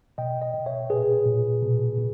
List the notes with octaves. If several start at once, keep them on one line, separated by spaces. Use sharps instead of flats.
B2 D#5 G5
D#5 G5
B2
C#5 E5
A#2 G#4 B4
A#2
B2
B2